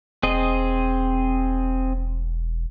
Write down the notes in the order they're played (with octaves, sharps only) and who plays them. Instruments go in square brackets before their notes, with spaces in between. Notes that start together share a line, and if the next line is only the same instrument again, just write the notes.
[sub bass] E1 [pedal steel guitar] C4 G#4 D#5